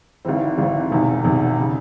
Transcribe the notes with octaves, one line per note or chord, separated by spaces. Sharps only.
G#1 G#2 E3 C4
G#1 G#2 E3 C4
E1 E2 C3 D#3
E1 E2 C3 D#3
C#3